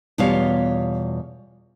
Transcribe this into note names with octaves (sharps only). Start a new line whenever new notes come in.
E2 B2 G3 F4 C#5 F5